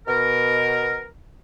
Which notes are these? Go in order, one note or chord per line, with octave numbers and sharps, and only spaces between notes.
B2 A#4